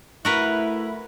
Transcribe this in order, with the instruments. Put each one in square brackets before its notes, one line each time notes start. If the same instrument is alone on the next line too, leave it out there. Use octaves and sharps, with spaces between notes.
[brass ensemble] A3 E4 [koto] F#4 A#4 B4